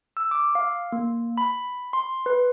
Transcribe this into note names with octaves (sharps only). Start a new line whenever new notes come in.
E6
D6
F5
A#3
B5
C6
B4